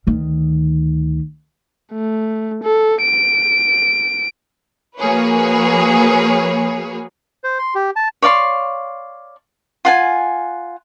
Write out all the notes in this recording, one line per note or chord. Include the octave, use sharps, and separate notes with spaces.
D2 D#3
A3
A4
D7
F3 A#3 F#4 G#4 B4 C#5
C5
C6
G4
A5
C#5 D5 F5 C6
F4 F#5 G#5